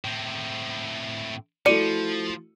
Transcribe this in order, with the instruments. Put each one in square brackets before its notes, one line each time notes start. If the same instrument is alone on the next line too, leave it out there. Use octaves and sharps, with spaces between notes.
[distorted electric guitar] A2 C4
[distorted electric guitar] F3 [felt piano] A3 E4 F#4 [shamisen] D5 [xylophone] C#7 D#7